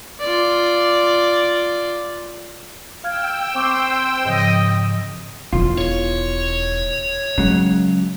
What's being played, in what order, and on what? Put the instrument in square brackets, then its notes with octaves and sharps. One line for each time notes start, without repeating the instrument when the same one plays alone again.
[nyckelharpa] F4 D5
[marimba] F5 F6 G#6 [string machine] G5 E6
[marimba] C4 C#6 D6 [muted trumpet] C5
[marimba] G#2 C#3 F3 [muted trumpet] D#5
[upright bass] E1 D#3 [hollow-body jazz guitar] F4
[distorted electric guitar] C#5
[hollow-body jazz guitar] C#3 F#3 [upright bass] G#3